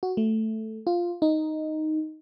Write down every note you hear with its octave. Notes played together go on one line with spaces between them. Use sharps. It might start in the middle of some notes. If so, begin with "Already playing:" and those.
F#4
A3
F4
D#4